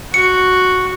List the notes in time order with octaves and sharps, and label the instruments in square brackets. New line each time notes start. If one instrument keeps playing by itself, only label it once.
[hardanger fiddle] F#4 [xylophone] C#7